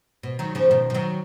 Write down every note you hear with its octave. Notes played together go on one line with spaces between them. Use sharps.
B2
D#3 F#3
C#3 F3
B2 D#3
F3
D#3 F#3